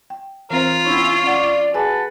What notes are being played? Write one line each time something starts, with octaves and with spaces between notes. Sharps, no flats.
G5
E3 C4 F4 A#4 C5
B3 C#4 D4 E4 C#5
C#4 D5 F#5
F#4 G#4 B4 F#5 G#5 A5